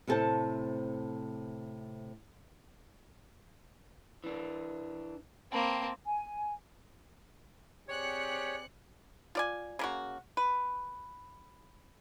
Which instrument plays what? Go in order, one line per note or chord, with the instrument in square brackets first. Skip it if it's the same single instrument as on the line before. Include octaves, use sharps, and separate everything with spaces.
[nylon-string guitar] A2 C3 F#4 A4 C5 A5
[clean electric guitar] E3 D4
[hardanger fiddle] A#3 C4 [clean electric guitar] G5 A5 B5
[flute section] G#5
[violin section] C4 F#6 C#7 [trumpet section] G4 G#4 D5 [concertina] C#5
[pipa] F4 D5 G#5
C#3 A#3 F#4
B4